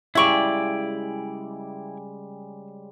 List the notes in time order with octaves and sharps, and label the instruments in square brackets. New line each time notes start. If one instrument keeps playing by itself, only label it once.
[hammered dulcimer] C#3 G3 G#3 [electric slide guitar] E4 D5 [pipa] E5 C#6